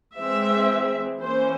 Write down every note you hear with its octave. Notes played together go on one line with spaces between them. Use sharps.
E3 G#3 C4 E5
E3 A#3 C#4 C5